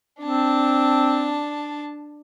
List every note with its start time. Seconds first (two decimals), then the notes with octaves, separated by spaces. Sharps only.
0.21 C4 D4 A5